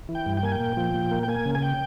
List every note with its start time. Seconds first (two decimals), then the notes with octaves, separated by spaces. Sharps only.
0.09 E3
0.15 G5
0.26 G2
0.37 G5
0.43 A#3 G#5
0.52 G5
0.60 A#2
0.77 F3
0.94 A#2
1.11 A#3
1.23 G5
1.28 A#3 G#5
1.46 C#3
1.55 G#5
1.62 G5